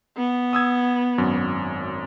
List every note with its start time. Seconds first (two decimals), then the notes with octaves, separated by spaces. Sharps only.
0.17 B3
0.53 D#6 E6 G#6
1.18 G#1 F#2